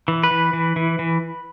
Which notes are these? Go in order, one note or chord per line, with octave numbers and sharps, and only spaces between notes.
E3
B4
E3
E3
E3
E3